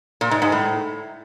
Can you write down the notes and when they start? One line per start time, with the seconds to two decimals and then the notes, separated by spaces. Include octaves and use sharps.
0.21 A#2
0.31 G#2
0.42 G#2
0.52 A2